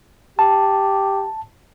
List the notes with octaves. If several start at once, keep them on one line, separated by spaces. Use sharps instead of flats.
G4 A5